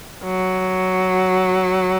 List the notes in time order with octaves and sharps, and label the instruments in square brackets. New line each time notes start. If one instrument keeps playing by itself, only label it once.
[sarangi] F#3